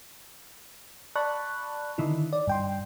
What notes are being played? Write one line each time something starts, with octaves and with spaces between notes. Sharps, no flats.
D5 A5 B5 C#6 F#6
D3 D#3 D#4 E4
D5
G2 G5 C6